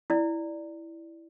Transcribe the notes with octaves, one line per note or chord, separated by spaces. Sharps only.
E4 D5